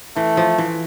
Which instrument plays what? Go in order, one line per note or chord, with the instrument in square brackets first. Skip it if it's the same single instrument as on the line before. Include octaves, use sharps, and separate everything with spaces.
[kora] E3 [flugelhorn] A3
[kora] F3
E3